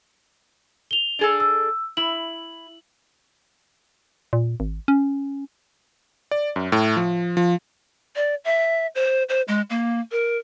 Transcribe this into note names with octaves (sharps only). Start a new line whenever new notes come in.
F7 G7
D4 G#4 A4
E6
E4 F#7
A#2
G#1
C#4
D5
F#2
A2
F3
F3
D5
E5
C5
C5
G#3
A#3
A#4